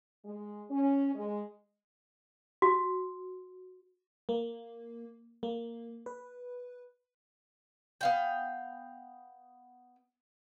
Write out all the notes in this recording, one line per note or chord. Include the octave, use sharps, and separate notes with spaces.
G#3
C#4
G#3
F#4
A#3
A#3
B4
B3 F5 G5